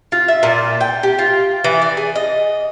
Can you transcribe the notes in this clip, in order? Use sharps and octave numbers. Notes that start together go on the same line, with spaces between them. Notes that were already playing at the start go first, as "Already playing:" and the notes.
F4
E5
A#2
G5
G4
F4
E3
D5
G#4
D#5